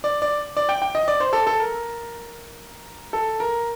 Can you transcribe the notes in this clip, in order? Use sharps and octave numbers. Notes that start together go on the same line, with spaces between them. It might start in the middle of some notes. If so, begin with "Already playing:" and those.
D5
D5
D5
G5
G5
D#5
D5
C5
A4
A4
A#4
A4
A#4